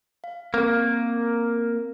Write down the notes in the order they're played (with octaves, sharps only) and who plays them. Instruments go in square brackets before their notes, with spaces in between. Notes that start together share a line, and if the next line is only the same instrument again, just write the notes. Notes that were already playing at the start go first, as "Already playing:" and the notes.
[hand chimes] F5
[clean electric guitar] A#3 [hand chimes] C4 A#4